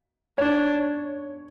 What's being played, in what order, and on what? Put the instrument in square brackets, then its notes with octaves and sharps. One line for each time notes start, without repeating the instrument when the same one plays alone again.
[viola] D4 [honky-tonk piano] C#5